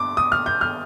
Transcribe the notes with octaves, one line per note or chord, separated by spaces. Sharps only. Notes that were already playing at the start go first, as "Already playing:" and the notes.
Already playing: G2 D6
D#6
F6
G6
F6